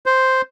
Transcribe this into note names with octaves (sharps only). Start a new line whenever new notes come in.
C5